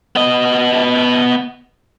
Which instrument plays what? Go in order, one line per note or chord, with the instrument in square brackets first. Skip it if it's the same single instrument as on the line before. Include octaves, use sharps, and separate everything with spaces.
[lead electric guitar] B3 D#5